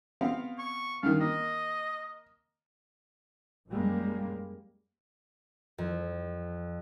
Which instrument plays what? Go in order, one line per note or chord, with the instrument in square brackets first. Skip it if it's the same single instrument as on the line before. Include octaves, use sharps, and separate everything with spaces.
[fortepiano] B3 C4 F5
[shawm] C#6
[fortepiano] G2 D#3 [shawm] F5
[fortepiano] A#3 [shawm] D#5
[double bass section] F#2 G3 G#3 A#3
[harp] F2